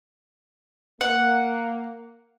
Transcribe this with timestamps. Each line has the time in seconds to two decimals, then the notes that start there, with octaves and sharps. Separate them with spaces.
1.01 A#3 F#5